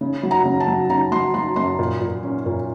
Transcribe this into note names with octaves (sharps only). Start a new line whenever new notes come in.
C#3
F#3
A#5
C#3
A5
F#3
C#3 A#5
F#3 C6
F#3 C6
F#2 C6
A#2
A#2
C#4
A#2